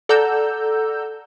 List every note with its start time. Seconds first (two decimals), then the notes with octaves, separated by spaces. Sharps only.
0.09 A4 D5 F#5 A#5 E6 G6